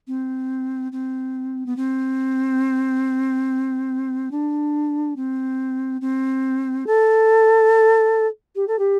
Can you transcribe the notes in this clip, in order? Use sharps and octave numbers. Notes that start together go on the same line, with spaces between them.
C4
C4
B3
C4
D4
C4
C4
A4
G4
A4
G4